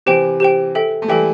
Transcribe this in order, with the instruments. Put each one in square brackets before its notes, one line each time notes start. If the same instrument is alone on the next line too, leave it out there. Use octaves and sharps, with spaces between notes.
[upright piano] C3 E3 [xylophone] G4 C5 G5
[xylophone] G4 C5 G5
A4 E5 G5
[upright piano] A3
[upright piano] E3 G3 [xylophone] A4 E5 G5